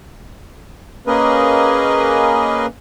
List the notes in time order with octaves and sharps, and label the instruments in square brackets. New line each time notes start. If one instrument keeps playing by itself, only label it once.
[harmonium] A#3 C#4 G#4 A#4 B4 D#5